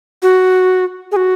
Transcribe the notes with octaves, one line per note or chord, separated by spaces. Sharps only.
F#4
G#4
F#4